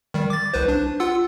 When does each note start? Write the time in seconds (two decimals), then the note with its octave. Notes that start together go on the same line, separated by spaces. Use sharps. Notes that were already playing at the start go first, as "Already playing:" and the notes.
0.14 D#3 G3
0.30 D6 A6
0.54 C2 B4 C5
0.68 D4
1.00 F4 F#5 E6